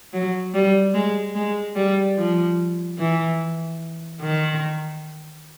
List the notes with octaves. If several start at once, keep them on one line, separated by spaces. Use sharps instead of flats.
F#3
G3
G#3
G#3
G3
F3
E3
D#3